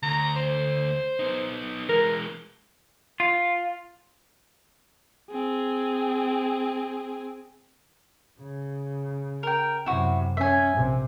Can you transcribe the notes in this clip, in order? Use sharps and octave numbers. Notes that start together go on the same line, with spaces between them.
D2 A#5
C5
B3 D#4
E3 G#3 A#4
F4
C4 G#4
C#3
A#4 G5
F#2 C3 E4 F#4
C#4 E5 G#5
A#1 C3